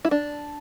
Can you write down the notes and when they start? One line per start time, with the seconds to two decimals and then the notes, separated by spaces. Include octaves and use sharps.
0.05 E4
0.11 D4